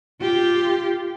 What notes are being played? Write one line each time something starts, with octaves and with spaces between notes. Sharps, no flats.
F4 G4